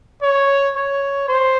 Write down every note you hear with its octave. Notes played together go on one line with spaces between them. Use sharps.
C#5
C#5
C5